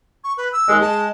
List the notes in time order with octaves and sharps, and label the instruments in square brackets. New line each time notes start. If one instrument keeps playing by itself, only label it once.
[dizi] C#6
B4
E6
[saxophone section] D#2 G#3
[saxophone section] G#3 [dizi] A5